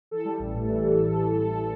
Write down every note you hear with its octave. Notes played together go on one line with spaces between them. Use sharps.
E3 A4
G3
A1
A2
E3
G3
A1
A2
E3
G3